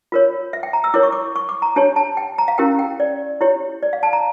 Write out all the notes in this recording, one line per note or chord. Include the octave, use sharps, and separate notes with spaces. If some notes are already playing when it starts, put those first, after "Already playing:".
F4 A#4 C#5
E5
G5
A#5
E6
E4 A#4 C#5 D6
C#6
D6
C#6
D6
A#5
D4 G4 C#5 A5
A5
G5
A#5
F5
C#4 E4 G4 A#4 G5
G5
D5
E4 G4 C#5
D5
F5
A5
A#5